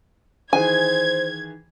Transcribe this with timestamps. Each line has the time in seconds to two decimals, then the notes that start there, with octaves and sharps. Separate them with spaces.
0.53 D#3 E3 G#4 C5 G#5 G#6